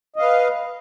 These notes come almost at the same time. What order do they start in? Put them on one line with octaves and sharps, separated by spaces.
D#5 F5 B4